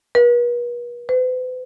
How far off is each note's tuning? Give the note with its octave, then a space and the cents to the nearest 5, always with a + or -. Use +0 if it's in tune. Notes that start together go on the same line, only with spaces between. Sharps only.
B4 -45
B4 +45